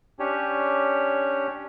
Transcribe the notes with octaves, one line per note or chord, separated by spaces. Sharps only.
C#4 D4 G4 C#5